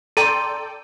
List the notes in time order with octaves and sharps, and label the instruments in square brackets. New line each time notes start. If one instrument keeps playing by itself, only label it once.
[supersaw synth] A4 D5 G5 [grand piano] A#5 C6 [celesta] D#7